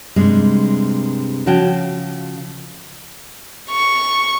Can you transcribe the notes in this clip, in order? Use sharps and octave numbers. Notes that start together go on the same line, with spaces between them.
G2 C3 G#3
C#3 F3 F#4 C#5 G5 A5
C#6